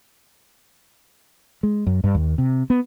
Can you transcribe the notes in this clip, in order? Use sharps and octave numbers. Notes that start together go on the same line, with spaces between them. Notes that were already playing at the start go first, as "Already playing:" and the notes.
G#3
F#2
G2
D#2
C3
B3